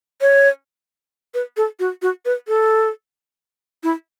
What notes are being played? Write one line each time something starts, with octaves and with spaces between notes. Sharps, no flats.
C#5
B4
A4
F#4
F#4
B4
A4
E4